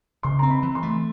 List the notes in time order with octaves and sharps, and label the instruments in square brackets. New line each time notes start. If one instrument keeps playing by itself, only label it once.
[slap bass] C#3 [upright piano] C6
[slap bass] C4 [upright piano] A#5
[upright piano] B5
[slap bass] E3
[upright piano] C6
[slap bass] A3